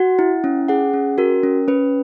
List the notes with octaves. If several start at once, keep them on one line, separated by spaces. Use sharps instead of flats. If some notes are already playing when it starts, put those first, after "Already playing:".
Already playing: F#4 F#5
E4
C#4
G#4 F#5
C#4
F#4 A#4
C#4
C#4 B4